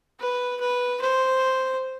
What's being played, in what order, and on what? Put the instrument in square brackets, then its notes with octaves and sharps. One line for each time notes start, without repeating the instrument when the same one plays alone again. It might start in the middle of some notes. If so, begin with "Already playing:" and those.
[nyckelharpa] B4
B4
C5